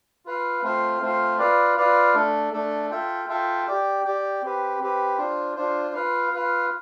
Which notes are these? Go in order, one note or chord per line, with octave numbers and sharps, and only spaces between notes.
F4 B4 F5
A3 C4 F4 C5 F5
A3 C4 F4 C5 F5
F4 B4 D5 F5
F4 B4 D5 F5
A3 D4 A4
A3 D4 A4
F4 A4 E5 G5
F4 A4 E5 G5
G4 D5 G5
G4 D5 G5
C4 G4 B4
C4 G4 B4
D4 F4 C5
D4 F4 C5
F4 B4 F5
F4 B4 F5